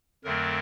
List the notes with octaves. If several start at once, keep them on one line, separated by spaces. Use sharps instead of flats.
F2 D3 F#3 A3 C4 A#4